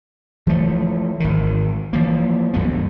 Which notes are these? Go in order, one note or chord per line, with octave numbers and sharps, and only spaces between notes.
E3 F3 A3
G#1 D#3
E3 F3 A#3
D2 G2 A3 B3